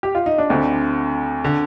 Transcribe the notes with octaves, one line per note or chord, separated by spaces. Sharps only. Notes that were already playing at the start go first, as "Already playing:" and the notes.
G4
F4
D#4
D4
D2 D3 C4
D3